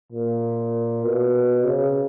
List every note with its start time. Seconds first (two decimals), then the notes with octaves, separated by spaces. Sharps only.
0.12 A#2
1.04 B2
1.66 C#3